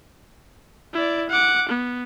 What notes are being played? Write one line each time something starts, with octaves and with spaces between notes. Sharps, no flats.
E4 D5
F#5 D6
B3